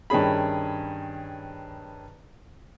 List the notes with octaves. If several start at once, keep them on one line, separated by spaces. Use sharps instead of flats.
G2 D#3 C#4 G#4 B5